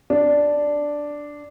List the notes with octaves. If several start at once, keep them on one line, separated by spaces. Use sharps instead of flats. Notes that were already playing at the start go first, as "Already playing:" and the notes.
D4